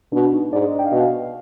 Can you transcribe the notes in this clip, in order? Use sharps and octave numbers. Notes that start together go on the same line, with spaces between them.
B2 D4
D#4
G#2 D5
D#5
G5
F5
B2 D#5
F5